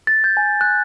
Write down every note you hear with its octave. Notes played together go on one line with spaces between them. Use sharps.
A6
G6
G#5
F#6